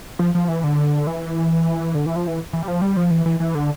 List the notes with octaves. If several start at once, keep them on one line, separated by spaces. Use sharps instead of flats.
F3
F3
E3
D3
E3
D3
E3
F3
E3
E3
G3
F3
G3
F3
E3
E3
E3
D3